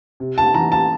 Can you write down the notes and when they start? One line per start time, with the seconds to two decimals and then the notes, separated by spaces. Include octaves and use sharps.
0.20 C3
0.38 A5
0.54 E3 A#5
0.72 A5